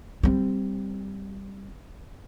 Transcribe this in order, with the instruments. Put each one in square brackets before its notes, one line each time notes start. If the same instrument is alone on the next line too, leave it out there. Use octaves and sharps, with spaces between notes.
[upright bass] G3 C4